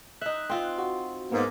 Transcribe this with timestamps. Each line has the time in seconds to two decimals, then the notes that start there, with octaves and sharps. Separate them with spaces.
0.21 D#4 E5 F#6
0.50 C4 F4
0.78 F#4
1.32 G#2 A#3 B3